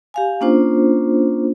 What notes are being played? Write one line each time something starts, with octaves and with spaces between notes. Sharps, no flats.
G4 F5 G#5
A#3 C#4 D4 F4 C5